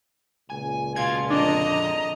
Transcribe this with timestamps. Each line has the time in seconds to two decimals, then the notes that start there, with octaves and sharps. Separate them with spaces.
0.50 C#2 A#2 G#5
0.96 B2 F4 G#6
1.30 F2 D3 D4 D#5 A#5